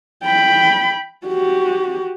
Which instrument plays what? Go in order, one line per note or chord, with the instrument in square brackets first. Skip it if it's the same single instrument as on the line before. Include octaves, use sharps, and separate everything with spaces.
[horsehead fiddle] G5 B5
F#4 G4